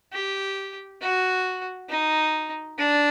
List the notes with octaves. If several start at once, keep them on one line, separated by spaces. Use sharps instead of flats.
G4
F#4
D#4
D4